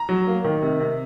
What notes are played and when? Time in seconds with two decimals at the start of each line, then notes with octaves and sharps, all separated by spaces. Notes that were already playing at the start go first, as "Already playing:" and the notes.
Already playing: A#5
0.09 F#3
0.27 A#3
0.45 D#3
0.62 C3
0.80 C3